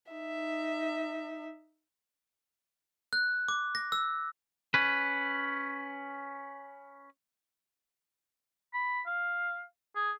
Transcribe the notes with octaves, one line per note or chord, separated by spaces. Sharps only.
D#4 E5
F#6
D6
A#6
E6
C#4 B4
B5
F5
G#4